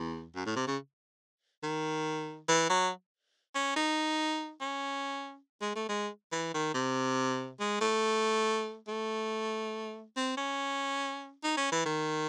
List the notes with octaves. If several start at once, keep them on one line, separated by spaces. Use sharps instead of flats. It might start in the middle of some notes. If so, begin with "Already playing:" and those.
Already playing: E2
F#2
A2
C3
C#3
D#3
E3
F#3
C#4
D#4
C#4
G#3
A3
G#3
E3
D#3
C3
G#3
A3
A3
C4
C#4
D#4
C#4
E3
D#3